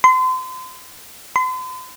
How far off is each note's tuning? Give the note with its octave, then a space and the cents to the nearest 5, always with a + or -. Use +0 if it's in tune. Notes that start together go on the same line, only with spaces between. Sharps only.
C6 -35
C6 -45